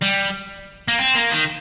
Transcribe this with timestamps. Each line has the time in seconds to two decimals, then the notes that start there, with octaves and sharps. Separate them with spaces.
0.02 G3
0.88 A#3
0.99 C4
1.15 A#3
1.32 D#3